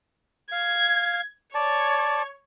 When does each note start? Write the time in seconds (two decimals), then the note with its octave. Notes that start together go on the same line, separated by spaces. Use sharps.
0.52 F5 G#6
1.55 C#5 D5 A5